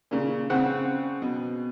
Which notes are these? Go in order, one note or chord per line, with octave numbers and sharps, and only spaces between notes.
A#2 C#3
C#3 C4 F#5
B2